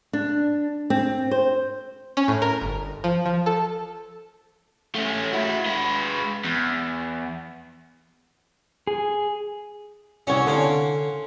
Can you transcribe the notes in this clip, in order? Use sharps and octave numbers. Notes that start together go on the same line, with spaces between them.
D4
C4
C5
C#4
A2
A#4
G1
F3
F3
A4
A3 C#4
E4 F#4
G#3 B4
E2
G#4
C2 C#4 F#4 C#5
D3 A#3 C#4 A4 C6